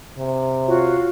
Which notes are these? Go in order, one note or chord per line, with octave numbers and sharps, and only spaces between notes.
C3
F4 F#4 C#5